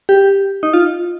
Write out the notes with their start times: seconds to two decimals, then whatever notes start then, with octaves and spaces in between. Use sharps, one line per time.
0.09 G4
0.63 D#4
0.73 F4